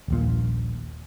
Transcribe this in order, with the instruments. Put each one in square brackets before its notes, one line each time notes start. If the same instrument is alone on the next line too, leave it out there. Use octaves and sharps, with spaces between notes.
[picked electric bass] D#1 A#1 A#2